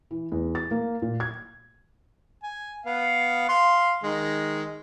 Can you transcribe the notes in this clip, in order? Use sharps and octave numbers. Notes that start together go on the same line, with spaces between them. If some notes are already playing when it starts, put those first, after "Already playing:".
E3
E2
A6
A#3
A#2
G#6
G#5
B3 F5
F5 C6
D#3 G#3